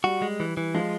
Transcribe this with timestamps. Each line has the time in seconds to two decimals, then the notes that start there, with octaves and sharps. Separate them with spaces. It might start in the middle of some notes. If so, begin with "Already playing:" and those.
0.04 G3 F#4
0.22 G#3
0.40 E3
0.57 E3
0.74 F3 G#3